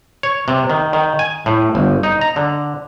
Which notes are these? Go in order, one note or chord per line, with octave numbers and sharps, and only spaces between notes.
C#5
C3
D#3
D#3
G#5
A2
G1
D#4
A#5
D3